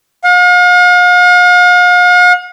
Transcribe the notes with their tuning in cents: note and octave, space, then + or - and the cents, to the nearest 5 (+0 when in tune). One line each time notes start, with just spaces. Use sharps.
F5 +45